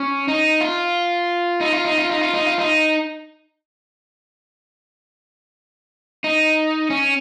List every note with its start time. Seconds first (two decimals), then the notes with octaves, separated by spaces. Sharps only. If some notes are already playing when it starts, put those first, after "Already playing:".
Already playing: C#4
0.28 D#4
0.61 F4
1.60 D#4
1.72 F4
1.85 D#4
1.98 F4
2.10 D#4
2.21 F4
2.34 D#4
2.46 F4
2.59 D#4
6.24 D#4
6.90 C#4